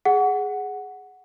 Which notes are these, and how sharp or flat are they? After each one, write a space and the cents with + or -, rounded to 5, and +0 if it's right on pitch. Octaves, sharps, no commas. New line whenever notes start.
G#4 +0 F#5 +0